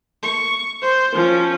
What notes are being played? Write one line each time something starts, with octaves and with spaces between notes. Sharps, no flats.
C#6
C5
F3 C#4